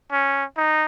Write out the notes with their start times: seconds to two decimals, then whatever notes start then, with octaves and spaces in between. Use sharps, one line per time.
0.12 C#4
0.57 D#4